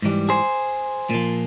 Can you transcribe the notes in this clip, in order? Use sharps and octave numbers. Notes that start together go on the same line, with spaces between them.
G#2 E3 G3
G#4 C5
A#2 F3